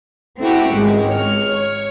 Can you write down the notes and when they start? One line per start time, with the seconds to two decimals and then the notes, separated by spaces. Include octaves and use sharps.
0.39 A3 C4 E4 F#4 G4
0.73 G#1 C#2 G#3
1.09 C#5 F6
1.52 C#5